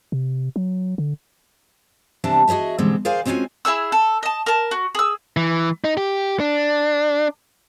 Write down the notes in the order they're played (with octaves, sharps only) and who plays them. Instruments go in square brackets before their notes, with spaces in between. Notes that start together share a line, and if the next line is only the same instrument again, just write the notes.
[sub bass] C3
F#3
D3
[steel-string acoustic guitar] C3 E3 G3 D4 A5
F#4 G#4 C#5 D#5 E5
B2 D3 E3 G3 G#3 C4
G#4 A#4 C5 D5 F5 G#5
G#3 C4 C#4 F4 F#4 G#5
[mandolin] E4 G#4 E5 E6
A4
D#5 A5
A#4 A5
F#4
G#4 E6
[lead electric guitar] E3
D#4
G4
D4